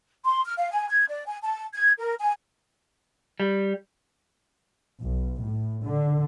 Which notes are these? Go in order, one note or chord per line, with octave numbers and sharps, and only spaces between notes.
C6
F6
F5
G#5
G#6
D5
G#5
A5
G#6
A#4
G#5
G3
B1
A2
D3